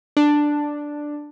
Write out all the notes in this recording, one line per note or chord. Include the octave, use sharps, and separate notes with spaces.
D4